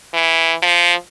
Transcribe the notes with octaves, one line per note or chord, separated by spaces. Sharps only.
E3
F3